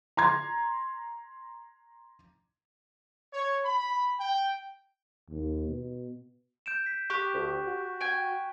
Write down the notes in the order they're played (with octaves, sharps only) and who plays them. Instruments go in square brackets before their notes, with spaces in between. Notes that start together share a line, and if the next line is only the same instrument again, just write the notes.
[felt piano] A#5 C6 G#6
[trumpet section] C#5
B5
G5
[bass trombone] D#2
B2
[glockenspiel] G6 D7 E7
B6
[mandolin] G4 [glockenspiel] C#6 F#6
[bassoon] D2
F#4
[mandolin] G5 G#5